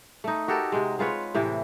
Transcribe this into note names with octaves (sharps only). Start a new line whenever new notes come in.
A3 D#4
F#4 G4 A4 A#4
C3 G#3
G#3 F4 B4 C#5
A2 C3 E3 E4